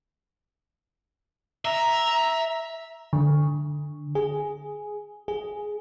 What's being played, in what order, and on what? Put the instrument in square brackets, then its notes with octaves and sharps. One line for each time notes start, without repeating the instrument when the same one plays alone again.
[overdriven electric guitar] E5 [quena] A#5
[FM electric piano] D3
G#4
G#4